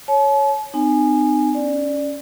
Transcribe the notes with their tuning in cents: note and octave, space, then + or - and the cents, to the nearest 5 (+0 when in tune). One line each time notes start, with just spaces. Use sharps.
C#5 +0 A5 -45
C4 -45 D#4 -35 G#5 +0
C#4 +10 D5 +5